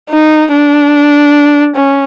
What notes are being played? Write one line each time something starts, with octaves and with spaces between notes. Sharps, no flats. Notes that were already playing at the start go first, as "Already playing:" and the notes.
D#4
D4
C#4